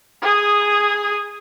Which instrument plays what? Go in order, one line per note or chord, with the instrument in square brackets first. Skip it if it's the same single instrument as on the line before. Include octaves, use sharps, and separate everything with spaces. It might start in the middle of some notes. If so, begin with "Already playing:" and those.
[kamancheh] G#4 D#6